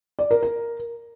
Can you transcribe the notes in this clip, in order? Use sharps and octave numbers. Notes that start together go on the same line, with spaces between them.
D5
A#4
A#4